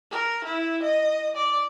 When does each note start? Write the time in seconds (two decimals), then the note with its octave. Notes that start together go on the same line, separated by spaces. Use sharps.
0.11 A#4
0.44 E4
0.83 D#5
1.35 D5